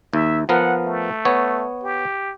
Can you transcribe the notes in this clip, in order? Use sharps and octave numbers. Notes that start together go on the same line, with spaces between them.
D#2 E5
F3 B3 A#4 F#5
A3
B3 C#5
G4